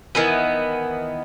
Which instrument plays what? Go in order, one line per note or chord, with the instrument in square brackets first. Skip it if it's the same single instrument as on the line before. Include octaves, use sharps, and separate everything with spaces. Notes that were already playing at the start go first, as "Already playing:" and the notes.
[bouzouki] D#3 E3 B3